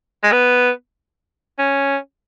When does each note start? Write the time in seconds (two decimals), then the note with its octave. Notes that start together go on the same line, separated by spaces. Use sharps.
0.23 G#3
0.32 B3
1.59 C#4